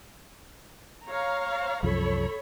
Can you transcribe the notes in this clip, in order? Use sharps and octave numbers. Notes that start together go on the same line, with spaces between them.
C#5 F5 A#5
C2 F#2 F3 A4 C#5 B5